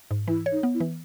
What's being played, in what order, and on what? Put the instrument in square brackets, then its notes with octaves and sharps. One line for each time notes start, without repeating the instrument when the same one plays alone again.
[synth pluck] G#2
[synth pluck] E3 [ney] E4
[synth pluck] C#5
[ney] D#4
[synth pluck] B3
[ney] E4
[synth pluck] E3